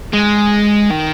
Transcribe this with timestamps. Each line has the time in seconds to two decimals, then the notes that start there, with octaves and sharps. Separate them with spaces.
0.13 G#3
0.91 D#3